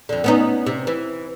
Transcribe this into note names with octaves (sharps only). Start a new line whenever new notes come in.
F2 D3
B3 C#4 D#4
C3
E3